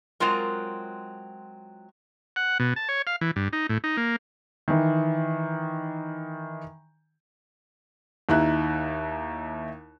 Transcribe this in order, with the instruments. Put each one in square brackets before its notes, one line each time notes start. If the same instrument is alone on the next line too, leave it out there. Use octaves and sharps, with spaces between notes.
[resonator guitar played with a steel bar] F#3 G#3 C4 F4 A#4
[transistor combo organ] F#5
B2
A5
C#5
F5
E3
G2
D#4
A2
D#4
A#3
[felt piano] D#3 E3
D#2 D#4 E4 F#6